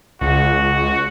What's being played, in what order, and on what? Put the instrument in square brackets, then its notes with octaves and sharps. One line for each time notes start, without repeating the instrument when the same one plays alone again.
[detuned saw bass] C#2 [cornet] F#4